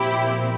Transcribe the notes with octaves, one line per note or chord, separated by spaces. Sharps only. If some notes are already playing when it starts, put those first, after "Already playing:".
Already playing: A#2 F3 C4 E4 G4